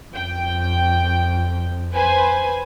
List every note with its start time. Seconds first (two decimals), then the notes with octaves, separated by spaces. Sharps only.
0.15 F2 G5
1.94 B4 C5 G#5